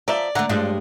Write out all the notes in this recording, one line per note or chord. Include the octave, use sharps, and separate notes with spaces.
F3 D5 E5 A#5
D3 A3 F#5 A#5
G2 F3 G3 G#3